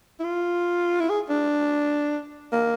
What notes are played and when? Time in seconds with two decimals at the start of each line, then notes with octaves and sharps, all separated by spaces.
0.20 E4
0.24 F4
1.00 E4
1.10 G#4
1.29 D4
2.52 A#3